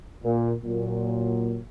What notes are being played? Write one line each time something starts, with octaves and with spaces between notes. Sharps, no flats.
A#2
A#2 F#3